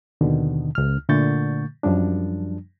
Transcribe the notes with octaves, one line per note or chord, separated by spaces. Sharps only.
D#2 B2 D3 D#3
C#2 F6
A#2 D3 A3 C#6 G6 A6
F#2 F3 G3 D4